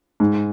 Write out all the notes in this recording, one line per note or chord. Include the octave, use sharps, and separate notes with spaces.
G#2